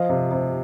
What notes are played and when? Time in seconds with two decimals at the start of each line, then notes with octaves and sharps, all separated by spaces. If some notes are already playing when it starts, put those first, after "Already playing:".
Already playing: F3 D#5 F5
0.09 C3
0.31 C3